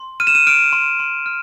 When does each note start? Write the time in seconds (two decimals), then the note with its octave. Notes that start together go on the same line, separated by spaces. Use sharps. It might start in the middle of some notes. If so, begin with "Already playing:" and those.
Already playing: C6
0.20 F6 D#7
0.27 E7
0.35 D#7
0.47 F6 D7
0.73 C6
1.00 C6
1.26 F6